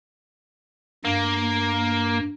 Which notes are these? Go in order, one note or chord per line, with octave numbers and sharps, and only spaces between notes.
G2 A#3